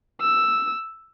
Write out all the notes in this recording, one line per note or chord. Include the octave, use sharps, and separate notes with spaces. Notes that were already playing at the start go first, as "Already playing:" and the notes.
E6